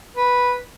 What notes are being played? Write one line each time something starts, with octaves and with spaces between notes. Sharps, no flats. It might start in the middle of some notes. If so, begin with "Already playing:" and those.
B4